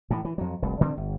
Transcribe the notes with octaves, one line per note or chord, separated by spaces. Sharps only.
A2 E3
E3
F2 F#3
F1 C2
D3 C4
G1